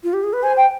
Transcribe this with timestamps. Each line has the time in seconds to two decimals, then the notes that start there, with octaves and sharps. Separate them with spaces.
0.04 F4
0.13 G4
0.23 G#4
0.33 B4
0.43 C5 G#5
0.56 G5